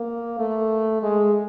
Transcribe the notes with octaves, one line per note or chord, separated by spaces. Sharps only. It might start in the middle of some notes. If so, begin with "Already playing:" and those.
Already playing: A#3
A3
G#3